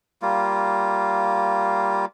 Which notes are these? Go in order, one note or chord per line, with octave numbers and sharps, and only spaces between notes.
G3 A#3 F4